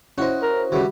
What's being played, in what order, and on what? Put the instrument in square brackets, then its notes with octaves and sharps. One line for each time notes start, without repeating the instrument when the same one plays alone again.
[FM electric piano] C#4 E4 C5 [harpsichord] F#4 D#5
[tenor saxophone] A#4
[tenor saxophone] C#3 [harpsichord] E3 G3 [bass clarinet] F#4